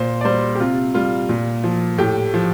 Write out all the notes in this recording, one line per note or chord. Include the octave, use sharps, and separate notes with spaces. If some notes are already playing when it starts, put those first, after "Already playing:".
Already playing: A#2 C5
D5
G3 C5
G4
C3 F4
G3 F4
A#2
F3
A2 G4
F3